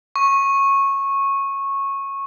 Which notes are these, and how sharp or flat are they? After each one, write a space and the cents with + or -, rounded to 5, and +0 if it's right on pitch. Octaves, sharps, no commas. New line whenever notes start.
C#6 -15